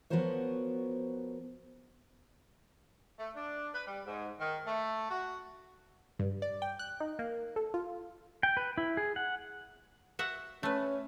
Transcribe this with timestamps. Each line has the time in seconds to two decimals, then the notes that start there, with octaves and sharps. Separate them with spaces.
0.10 F3 B3 F#4 A#4 C5 C#5
3.19 A3
3.35 D4
3.73 B4
3.86 G3
4.06 G#2
4.40 D#3
4.67 A3
5.10 F#4
6.19 G2
6.42 D5
6.62 G5
6.79 F#6
7.00 D#4
7.19 A#3
7.56 A4
7.74 F4
8.43 G5
8.57 B4
8.78 E4
8.97 G#4
9.16 F#5
10.19 F#4 E5 F#5
10.63 A3 C#4 B4